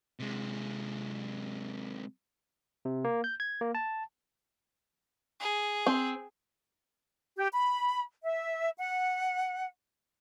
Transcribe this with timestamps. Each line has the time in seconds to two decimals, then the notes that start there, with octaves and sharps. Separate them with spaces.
0.20 C3 G#3
2.85 C3
3.04 A#3
3.24 G6
3.40 G#6
3.61 A#3
3.75 A5
5.40 G#4
5.86 C4
7.37 G4
7.53 B5
8.23 E5
8.78 F#5